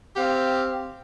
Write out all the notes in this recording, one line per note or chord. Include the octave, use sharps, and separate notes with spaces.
C4 G4 F5